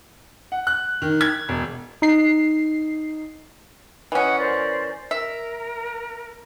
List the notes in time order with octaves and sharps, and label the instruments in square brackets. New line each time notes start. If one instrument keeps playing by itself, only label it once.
[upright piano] F#5
F#6
D#3
G#6
E1
[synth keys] D#4 C7
[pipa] E3 C#4 [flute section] D#5 F#5 D#6
[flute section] A#4 C5 D5
[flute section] A#4 [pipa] E5